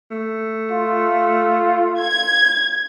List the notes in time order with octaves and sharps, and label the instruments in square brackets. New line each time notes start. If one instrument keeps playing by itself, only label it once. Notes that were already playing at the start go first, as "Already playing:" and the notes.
[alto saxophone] A3
[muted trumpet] F4
[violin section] G#6